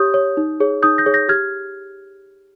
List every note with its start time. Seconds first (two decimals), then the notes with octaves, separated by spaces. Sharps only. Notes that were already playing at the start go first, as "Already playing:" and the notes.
Already playing: G4 C#5 D#6 G6
0.14 C#5
0.37 D#4
0.60 G#4 C#5
0.82 D#4 D#6 G6
0.98 G6 A#6
1.06 G#4 C#5
1.14 G6 A#6
1.29 G4 F6 G#6